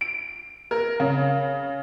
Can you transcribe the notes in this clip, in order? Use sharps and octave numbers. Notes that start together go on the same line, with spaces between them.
D7
A#4
C#3